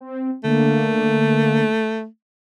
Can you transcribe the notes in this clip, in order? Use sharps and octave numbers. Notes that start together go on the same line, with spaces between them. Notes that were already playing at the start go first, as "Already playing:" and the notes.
C4
D3 A3 A#3